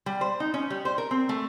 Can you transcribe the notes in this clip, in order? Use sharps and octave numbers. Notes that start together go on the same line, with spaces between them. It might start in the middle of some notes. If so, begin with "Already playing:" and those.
G3
C5
D#4
C#4
G3
C5
A#4
C4
A3